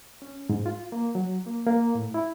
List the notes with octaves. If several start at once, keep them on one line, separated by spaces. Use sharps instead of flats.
C#4
G#2
F4
A#3
F#3
A#3
A#3
A2
E4